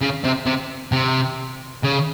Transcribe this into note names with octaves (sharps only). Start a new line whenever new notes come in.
C#3
C3
C3
C3
C#3